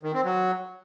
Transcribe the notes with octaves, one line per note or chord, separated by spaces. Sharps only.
D#3
C4
F#3